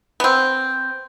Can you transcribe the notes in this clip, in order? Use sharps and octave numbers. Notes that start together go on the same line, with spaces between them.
B3 C4